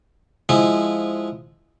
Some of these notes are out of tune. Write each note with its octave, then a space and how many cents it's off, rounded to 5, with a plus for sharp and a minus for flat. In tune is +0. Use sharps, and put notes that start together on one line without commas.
F3 +0 G#3 +0 E4 +0